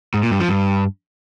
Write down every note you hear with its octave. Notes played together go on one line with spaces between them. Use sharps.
G#2
A#2
G2
F3
G2